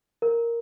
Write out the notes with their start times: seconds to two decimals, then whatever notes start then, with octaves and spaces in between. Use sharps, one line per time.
0.22 A#4